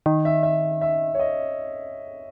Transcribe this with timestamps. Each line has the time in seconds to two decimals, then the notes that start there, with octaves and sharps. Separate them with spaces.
0.06 D#3
0.25 E5
0.43 E5
0.81 E5
1.15 C#5
1.19 D#5